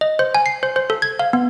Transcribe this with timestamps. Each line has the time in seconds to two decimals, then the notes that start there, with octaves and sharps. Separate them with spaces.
0.01 D#5
0.19 C5
0.35 G#5
0.46 C7
0.63 C5
0.76 C5
0.90 A4
1.02 G#6
1.19 F5
1.33 B3